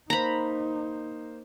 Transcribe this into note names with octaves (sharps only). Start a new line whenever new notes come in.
A#3 D#4 C5 A#5 B5